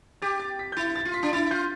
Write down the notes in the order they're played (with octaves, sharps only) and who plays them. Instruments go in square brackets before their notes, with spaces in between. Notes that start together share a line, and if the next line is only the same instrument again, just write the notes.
[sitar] G4 [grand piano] A6
[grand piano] A6
B6
G6
[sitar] E4 [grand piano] A6
[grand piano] A6
[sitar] F4
[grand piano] B6
[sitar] D4
[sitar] E4 [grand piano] A6
[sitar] F4 [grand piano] G6